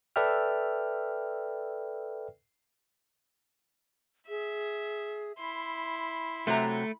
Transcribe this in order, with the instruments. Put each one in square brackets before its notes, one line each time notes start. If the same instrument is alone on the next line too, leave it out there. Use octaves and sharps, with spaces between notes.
[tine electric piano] A4 B4 D5 E5 G5 F6
[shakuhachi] G#4 [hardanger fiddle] E5
[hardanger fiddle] E4 C6 [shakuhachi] B5
[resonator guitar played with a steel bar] C3 F#3 A#5 [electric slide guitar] A3